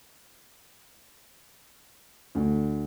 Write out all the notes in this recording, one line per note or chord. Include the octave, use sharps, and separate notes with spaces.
D2